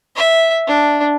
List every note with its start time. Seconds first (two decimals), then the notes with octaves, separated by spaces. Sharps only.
0.16 E5
0.67 D4